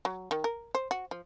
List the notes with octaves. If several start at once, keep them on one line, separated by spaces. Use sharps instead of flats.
F#3
D#3
A#4
C5
F#4
F3